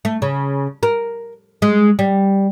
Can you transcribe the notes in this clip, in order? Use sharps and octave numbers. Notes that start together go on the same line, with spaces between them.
A3
C#3
A#4
G#3
G3